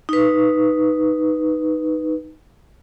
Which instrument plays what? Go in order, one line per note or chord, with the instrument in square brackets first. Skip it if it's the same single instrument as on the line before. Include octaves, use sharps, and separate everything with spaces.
[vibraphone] D#4 B4